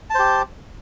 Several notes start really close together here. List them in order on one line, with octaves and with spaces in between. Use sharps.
A5 C5 G4